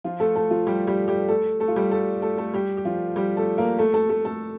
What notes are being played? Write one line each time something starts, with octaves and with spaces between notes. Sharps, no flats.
F3 F4
A3 A4
A3 A4
F3 F4
G3 G4
G3 G4
G3 G4
A3 A4
A3 A4
F4
G3 G4
A3 A4
A3 A4
A3 A4
G3 G4
G4
F3 F4
G3 G4
A3 A4
A#3 A#4
A3 A4
A3 A4
A3 A4
A3 A4